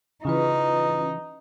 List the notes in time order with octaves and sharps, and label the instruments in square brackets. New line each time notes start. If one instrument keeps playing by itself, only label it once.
[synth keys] C#3 E3 [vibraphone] C#4 F4 B4 [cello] D#4